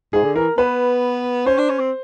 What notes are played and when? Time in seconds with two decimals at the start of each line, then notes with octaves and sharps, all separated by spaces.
0.13 G#2 G#4
0.24 D3
0.36 E3 A#4
0.58 B3 B4
1.46 C#4 C5
1.58 D4
1.70 C#4
1.80 C4